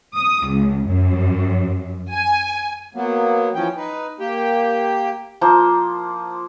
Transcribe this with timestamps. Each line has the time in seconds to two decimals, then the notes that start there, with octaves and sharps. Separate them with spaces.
0.15 D#6
0.46 C#2
0.87 F#2
2.11 G#5
2.95 F#3 A#3 B3
3.55 E3 F3 C#4 G5
3.77 D#4 B4
4.20 A#3 G4 G5
5.41 F3 A#3 C5